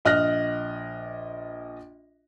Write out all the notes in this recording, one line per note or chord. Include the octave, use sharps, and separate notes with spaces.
A#1 D#5 F6 F#6 A#6